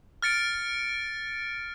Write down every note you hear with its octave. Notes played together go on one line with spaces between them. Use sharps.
F6 A6 C#7 D7